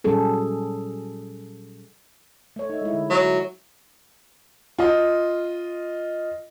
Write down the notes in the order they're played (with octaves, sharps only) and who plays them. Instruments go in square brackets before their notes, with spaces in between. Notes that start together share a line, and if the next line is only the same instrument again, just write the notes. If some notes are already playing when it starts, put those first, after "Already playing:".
[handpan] A#2 F#3 G3 C#4 G#4 A4
A3 C#5
D#4 E5
G#3 E4
D3
[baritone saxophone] F#3 [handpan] E5
[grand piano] F4 D#5